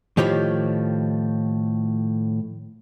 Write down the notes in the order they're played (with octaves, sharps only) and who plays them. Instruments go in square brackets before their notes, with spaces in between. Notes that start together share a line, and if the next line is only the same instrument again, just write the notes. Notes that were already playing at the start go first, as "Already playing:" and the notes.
[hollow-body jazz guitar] A2 D#3 F3 G4 C#5 B5